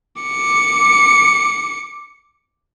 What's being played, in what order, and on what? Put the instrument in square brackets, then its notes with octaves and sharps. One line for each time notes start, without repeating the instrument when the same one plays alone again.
[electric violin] D6 C#7